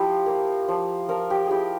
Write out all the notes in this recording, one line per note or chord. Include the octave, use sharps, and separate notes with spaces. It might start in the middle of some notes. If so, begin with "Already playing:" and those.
Already playing: F3 E4 G4
A#3
F3
F3 A#4
G4
E4 G4 G#4